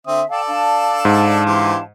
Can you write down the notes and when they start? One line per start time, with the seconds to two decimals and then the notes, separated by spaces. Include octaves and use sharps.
0.07 D3 C4 E5 D#6
0.30 A4 D5 F5 G5 A5
0.48 D4 F5 A5
1.05 G#2
1.46 E3 G4 C5